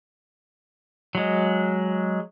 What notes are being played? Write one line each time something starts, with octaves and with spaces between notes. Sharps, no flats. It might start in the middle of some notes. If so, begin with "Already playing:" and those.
F#3 G#3